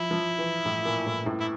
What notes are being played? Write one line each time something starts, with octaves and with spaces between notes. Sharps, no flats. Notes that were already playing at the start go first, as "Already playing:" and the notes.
Already playing: F3 E4
F3
E3
A2
A#2
A2
A2
E4